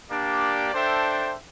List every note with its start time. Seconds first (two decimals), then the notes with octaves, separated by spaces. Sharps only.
0.11 A#3 D4 G4 D5
0.73 D4 A4 C5 E5 G5